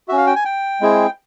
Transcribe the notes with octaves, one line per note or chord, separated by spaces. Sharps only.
C#4 F#4 E5
F5
G5
G#5
G5
G#3 C4 E4 G#4